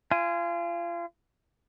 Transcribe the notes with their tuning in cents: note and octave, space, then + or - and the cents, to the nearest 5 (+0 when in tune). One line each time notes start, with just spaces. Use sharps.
F4 -30 G#5 +0